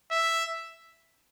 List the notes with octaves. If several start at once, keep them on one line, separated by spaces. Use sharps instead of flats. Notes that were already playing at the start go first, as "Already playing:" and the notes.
E5